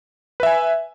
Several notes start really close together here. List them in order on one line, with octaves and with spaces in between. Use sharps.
B4 E5 G#5